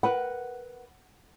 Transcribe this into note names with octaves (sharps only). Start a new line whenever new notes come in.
A#4 B4 F#5 B5